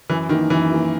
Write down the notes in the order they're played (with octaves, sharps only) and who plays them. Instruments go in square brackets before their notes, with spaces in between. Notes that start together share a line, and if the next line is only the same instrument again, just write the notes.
[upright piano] F#2 [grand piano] E3
[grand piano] D#3 [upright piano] E3 A#3
[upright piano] F#2 [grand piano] E3
[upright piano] E3 A#3